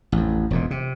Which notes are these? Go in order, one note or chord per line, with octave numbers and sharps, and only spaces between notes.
A1 F2
E1 F2 A#2
C3